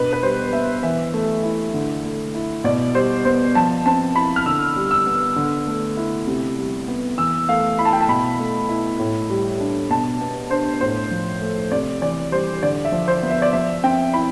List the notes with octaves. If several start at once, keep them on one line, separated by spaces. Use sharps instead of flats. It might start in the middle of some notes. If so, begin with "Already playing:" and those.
Already playing: B2 B3 D4 B4
B4
G3 C5
B3 E5
E3 E5
A3
E4
D3
A3
E4
B2 D5
G3 C5
B3 C5
F3 A5
C4 A5
E4 B5
F6
D3 E6
G3
E6
B3
D3
A3
E4
C3
G3
B3
E3 E6
A3 F5
E4 B5
A5
G5
A5
B2 B5
A3
E4
A2
G3
D4
B2 A5
B3
D4 C5
A2 C5
F3
A3
C3 D5
E3 D5
G3 C5
D3 D5
E5
F3
C5
B3
E5
D5
F3 E5
C4 G5
E4 B5